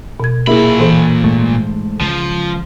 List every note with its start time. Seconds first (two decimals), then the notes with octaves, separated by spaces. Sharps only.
0.20 B2 G#6
0.47 A#2 A#3 E4 G#4 B5
0.79 E3 A4 C5
1.24 G#2 A3
2.01 C#2 F3